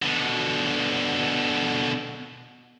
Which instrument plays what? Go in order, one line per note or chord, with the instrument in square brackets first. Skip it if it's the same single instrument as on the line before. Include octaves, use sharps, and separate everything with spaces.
[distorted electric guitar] B2 D3